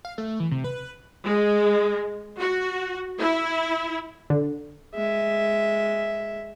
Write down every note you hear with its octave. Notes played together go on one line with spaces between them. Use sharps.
F5
A3
E3
C3
B4
G#3
F#4
E4
D3
G#3 E5